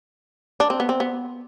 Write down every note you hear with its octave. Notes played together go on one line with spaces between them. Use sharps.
D4
C4
B3
C4
B3